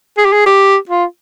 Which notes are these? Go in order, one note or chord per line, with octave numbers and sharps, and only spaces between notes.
G#4
G4
G#4
G4
F4